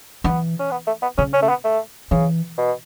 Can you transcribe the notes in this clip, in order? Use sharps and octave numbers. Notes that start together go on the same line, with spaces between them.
E3 B3
C#4
B3
A3
B3
C#3 C#4
C#4
A3
B3
A3
C#3 E3
B2